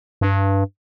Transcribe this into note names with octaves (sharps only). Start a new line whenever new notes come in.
G2